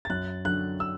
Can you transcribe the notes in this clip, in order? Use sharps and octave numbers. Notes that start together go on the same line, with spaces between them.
A6
F#2 F#6
D3 F#3 F#6
E6